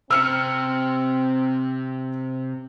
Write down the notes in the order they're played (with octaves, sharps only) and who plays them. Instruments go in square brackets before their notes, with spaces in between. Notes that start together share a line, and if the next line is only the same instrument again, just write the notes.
[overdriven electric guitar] C3 [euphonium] C4 [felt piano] E6 F6 C#7